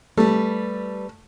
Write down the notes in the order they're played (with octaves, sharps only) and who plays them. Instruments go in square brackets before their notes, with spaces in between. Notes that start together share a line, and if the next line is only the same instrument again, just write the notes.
[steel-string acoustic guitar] G3 B4 [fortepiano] A3